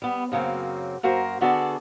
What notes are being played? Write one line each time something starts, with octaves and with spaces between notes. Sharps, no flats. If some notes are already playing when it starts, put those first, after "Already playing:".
G3 B3
F#2 C#3 F#3 A#3 C4
F#2 A#3 F#4 A#4 C5
D3 B3 F#4 G#4 A4 D5